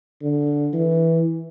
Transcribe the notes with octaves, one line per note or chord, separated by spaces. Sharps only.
D3
E3